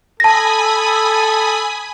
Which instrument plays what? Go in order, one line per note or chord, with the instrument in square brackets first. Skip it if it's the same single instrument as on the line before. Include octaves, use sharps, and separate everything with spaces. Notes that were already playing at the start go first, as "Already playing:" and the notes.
[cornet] A4 [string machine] G#5 B5 D#6 [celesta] A5 A#6